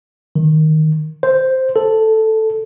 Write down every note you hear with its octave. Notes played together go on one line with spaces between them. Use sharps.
D#3
C5
A4